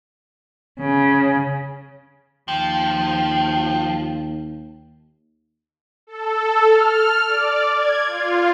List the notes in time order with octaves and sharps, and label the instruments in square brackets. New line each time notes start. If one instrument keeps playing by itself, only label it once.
[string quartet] C#3
[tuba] D#2 [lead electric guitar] F3 [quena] G5
[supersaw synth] A4
F6
D5
G#6
F4